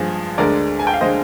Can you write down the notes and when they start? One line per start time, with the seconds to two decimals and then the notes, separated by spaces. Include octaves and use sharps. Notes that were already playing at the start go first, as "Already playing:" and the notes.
Already playing: G2 F3 G#3 G#4
0.38 D2 D3 G#3 A#4 D5
0.79 G#5
0.87 G5
0.94 F5
1.01 D3 G#3 C5 D#5